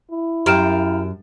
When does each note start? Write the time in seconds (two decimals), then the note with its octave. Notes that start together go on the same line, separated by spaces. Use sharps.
0.11 E4
0.46 F#2 G4 A#4 F5 G5 D7 E7